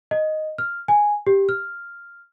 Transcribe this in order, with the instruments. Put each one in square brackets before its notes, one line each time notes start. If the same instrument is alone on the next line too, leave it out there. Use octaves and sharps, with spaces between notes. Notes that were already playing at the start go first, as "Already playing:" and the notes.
[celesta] D#5
F6
G#5
G4
F6